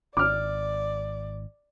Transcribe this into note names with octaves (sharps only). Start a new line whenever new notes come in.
G#1 D5 D6 F6